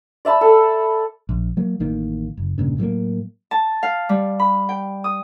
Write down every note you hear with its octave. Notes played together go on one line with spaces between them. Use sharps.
D5 E5 A5 B5
A4
A#1
F#3 A#3
A1 D#3 A#3
F#1
E1 G2 A#2 C#3
A2 F#3 A3 A#3
A5
F5
G3
B5
G5
D#6